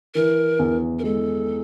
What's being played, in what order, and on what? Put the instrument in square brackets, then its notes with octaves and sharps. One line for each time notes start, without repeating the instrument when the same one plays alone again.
[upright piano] E3 [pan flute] A#4
[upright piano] E2
[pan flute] A#4
[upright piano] G#3 [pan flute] A4